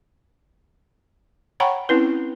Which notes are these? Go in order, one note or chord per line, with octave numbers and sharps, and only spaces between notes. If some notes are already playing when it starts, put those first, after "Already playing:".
C#5 F#5 G5 A#5 B5 C#6
C4 C#4 E4 B4